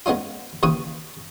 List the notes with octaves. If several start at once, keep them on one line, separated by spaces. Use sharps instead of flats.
G#3 B3 C#4 D#4 F4
D#2 C#3 E3 B4 C#6 D#6